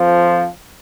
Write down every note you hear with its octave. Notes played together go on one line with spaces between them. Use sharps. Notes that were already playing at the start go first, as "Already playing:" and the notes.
Already playing: F2 F3